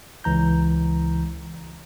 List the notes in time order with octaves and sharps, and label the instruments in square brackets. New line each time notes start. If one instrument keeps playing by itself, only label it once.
[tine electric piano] C#2 E3 A#5 G6